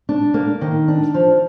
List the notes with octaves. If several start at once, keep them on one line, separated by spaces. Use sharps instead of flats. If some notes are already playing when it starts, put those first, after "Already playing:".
D4
A#3
D#3
D4
F3